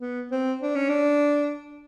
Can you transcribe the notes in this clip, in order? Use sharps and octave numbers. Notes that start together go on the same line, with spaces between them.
B3
C4
D4
C#4
D4